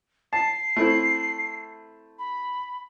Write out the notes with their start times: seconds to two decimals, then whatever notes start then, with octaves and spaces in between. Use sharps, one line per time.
0.33 A5 C7
0.76 A3 C4 E4
2.18 B5